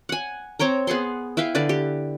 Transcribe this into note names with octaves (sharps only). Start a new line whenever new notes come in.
F#5 G#5
C4 C#5 G5 A#5
B3 G#4 F#5 C6
E4 B4 F5 G5
D3 B4 D5
G4